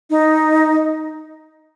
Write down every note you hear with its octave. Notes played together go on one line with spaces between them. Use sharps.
D#4